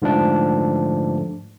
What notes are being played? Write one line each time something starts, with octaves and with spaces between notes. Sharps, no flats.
G#2 D3 F3 A3 D4